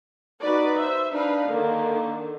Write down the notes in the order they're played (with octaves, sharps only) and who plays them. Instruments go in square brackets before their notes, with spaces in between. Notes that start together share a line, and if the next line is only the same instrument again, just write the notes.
[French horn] D#4 [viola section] F#4 B4 D5
[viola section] C5 E5
[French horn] D4 [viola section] D#4 B4 F5
[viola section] D3 D#3 [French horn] A#3